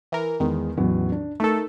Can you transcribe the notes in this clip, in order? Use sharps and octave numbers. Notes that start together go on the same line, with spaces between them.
E3 A#4
E2 D#3 G#3
A1 E2 F#3
D4
A3 D#4 A4 A#4